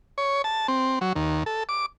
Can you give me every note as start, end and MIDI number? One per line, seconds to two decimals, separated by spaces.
0.18 0.42 73
0.44 0.67 81
0.68 0.99 60
1.01 1.13 54
1.16 1.43 39
1.46 1.63 69
1.69 1.86 86